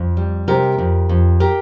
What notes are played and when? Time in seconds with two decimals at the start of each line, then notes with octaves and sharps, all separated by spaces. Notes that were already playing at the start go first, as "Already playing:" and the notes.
Already playing: F2
0.17 G3
0.48 C3 G4 A#4
0.78 F2
1.09 F2
1.40 G4 A#4